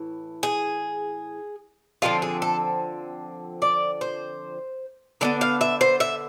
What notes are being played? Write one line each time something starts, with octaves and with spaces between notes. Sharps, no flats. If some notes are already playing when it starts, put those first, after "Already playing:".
Already playing: A2 E3 E4
G#4
D3 F3 G#3 C4 F4
G#4
A4
D5
C5
D3 G#3 B3 D5
F5
E5
C5
E5